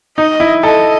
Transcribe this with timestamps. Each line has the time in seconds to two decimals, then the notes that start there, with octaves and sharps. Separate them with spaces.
0.18 D#4 D#5
0.40 E4
0.63 A4 D#5